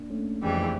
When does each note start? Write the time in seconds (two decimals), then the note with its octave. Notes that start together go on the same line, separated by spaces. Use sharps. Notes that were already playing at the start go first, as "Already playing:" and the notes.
Already playing: A#3 D4
0.10 A3 C#4
0.42 F2 C#3 E3 G3